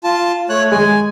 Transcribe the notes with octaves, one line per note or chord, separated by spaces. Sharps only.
F4 A5
A3 C#5 F#6
G#3 G#5